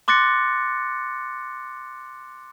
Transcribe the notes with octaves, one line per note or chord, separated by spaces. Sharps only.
C6 D6 F#6 A6 A#6 C#7